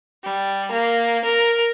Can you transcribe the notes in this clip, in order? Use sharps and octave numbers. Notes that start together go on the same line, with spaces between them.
G3
A#3
A#4